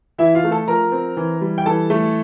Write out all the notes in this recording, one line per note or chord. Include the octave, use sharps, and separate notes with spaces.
E3 E4 E5
F4 F5
A3
A4 A5
F3 A#4 A#5
C4
E3
G3
G5
E3 A4 A5
A3